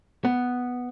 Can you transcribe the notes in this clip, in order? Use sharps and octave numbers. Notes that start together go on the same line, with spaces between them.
B3